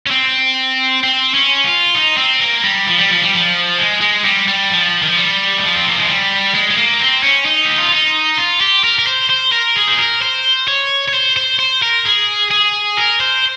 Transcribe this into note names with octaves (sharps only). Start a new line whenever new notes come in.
C#4
C4
C4
C#4
F4
D#4
C4
A#3
G3
F3
G3
F3
G3
F3
G#3
G#3
G3
G3
F3
D#3
F3
G3
D#3
F3
C4
A#3
G#3
G3
G#3
G#3
A#3
C4
C#4
D#4
G4
F4
D#4
F4
G4
A#4
A#4
C5
C5
A#4
G#4
C5
A#4
C5
C#5
C#5
C5
C5
C5
A#4
G#4
G#4
A#4
C5